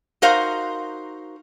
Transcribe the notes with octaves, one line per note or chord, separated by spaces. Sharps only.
D#4 F#4 A#4 C5 F5